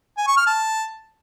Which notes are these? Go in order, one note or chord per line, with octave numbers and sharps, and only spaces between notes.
G#5
C#6
F6
A5